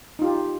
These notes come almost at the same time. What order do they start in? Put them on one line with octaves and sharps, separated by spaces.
D#4 F4 G4